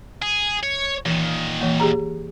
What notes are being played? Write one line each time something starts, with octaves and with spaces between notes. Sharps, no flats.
G#4
C#5
A#2 D#3 E3
E3 A#3
G4 G#4 A#5